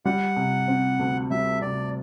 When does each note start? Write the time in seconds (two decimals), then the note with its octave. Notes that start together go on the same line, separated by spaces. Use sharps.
0.05 G3 F#5
0.36 C3
0.68 C4
0.99 D2
1.31 G3 E5
1.61 C3 D5